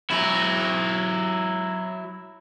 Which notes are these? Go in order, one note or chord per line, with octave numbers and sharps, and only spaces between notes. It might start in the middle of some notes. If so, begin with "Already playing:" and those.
F#3 E4